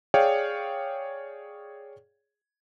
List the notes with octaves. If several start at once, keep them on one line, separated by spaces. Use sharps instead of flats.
G#4 C#5 D5 F5 G5